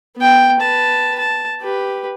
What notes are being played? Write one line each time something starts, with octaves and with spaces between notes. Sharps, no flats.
B3 G5
B4 A5
A5
G4 B4